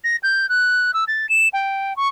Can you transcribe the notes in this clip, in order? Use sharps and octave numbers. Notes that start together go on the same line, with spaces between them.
A#6
G6
F#6
E6
A6
E7
G5
C#6